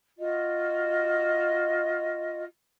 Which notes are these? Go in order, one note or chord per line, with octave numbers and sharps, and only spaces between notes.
F4 F#4 D#5